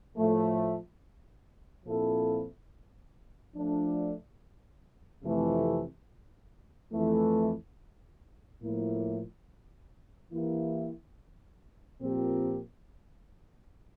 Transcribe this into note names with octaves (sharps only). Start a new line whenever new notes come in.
A2 F3 A3
A#2 F3 C4 E4 A4
F3 A3 D4 A4
F2 C3 E3 A3
F2 E3 A3
A2 F3 A#3 E4
E3 A#3 E4 G4
A#2 F3 C4 G4 A#4